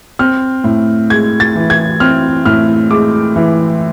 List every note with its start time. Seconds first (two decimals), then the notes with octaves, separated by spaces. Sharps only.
0.19 C4 F6
0.64 A2
1.10 G#3 G#6
1.40 A6
1.55 E3
1.70 G#6
2.00 C4 F6
2.45 A2 F6
2.90 G#3 D6
3.36 E3